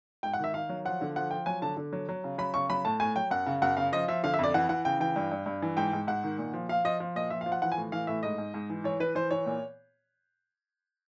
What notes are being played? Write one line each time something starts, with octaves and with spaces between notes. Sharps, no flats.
G#2 G5
F#5
D#3 E5
D#3 F5
F#3
F3 F#5
D3
F3 F#5
F3 G5
F#3 G#5
D3 A5
D3
F#3
F#3
C#3
F#3 B5
C#3 C#6
F#3 B5
A2 A5
A2 G#5
F#3 G5
F#2 F#5
C#3
F#2 F#5
C#3 F5
F3 D#5
F3 E5
D3 F5
E5
F2 D5
E3 F#5
E3 F#5
C#3 G5
E3 G5
G2
G2
G2
E3
G#2 G5
G#2
G#2 F#5
D#3
A#2
F3
F3 F5
F3 D#5
F3
A#2 D#5
F3 E5
F5
F3
F#5
E3 F#5
G#5
A2
E3 F5
A2 E5
G#2 D#5
G#2
G#2
E3
E3 C#5
E3 B4
E3 C5
E3 C#5
A#2